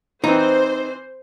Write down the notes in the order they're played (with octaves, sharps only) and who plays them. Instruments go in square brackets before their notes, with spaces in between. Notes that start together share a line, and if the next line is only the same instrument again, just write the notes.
[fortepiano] E3 C4 [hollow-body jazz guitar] D#4 [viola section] C5